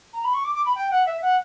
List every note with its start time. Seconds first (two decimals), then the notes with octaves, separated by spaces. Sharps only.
0.13 A#5
0.24 B5
0.34 C#6
0.44 D6
0.55 D6
0.66 B5
0.75 G5
0.91 F#5
1.06 E5
1.22 F#5